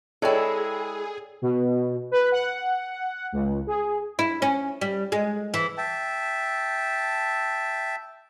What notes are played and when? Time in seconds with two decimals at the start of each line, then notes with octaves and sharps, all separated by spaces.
0.22 G#3 E4 G#4 A4 C#5 D5 G5
1.42 B2
2.11 B4
2.32 F#5
3.32 C#2
3.67 G#4
4.19 E4
4.42 C#4
4.81 G3
5.12 G#3
5.54 E3
5.78 E5 G5 A5